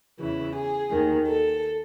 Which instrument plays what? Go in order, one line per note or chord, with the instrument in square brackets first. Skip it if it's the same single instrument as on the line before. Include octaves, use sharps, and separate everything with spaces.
[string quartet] E2 C#3 E3 E4
G#4
D#2 D#3
A4